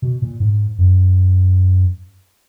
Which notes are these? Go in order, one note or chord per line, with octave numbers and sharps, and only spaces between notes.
B2
A#2
G#2
F#2